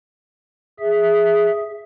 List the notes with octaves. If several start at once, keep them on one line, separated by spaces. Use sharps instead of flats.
G#4 E5